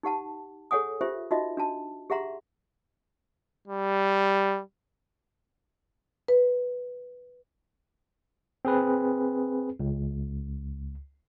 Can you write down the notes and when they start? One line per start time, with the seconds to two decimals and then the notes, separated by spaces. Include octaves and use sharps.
0.03 D#4 G4 F#5 A5
0.71 G#4 A4 C#5 F#5 G#5 D#6
1.01 F4 G4 C5 E5
1.31 D#4 F4 F#4 D#5 E5
1.57 D4 F#4 A5
2.10 G4 G#4 E5 F#5 A#5 C6
3.67 G3
6.28 B4
8.65 C4 G#4 B4
9.80 C#2